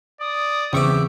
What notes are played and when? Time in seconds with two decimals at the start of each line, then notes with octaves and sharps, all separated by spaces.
0.20 D5 D#6
0.73 E2 C#3 C4 G4 E5 C#6 D6